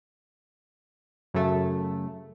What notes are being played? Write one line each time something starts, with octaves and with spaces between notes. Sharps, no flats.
F#2 C#3 A3